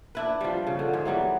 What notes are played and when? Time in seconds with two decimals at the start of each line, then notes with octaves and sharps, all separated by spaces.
0.15 D4 E4 B4
0.41 F3 G3
0.67 C#3
0.79 D3
0.93 G#2 G#4
1.05 E3 F#3 G3 B3